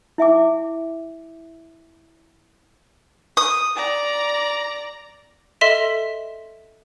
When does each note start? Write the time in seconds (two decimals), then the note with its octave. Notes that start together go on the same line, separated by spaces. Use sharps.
0.18 E4 E5 G#5 D6
3.37 D#6
3.76 D5 A#5
5.61 A4 D#5 E5 C6 B6 E7